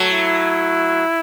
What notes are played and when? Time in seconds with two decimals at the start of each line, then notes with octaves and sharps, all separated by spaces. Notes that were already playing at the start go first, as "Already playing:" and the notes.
Already playing: F#3 A3
0.10 E4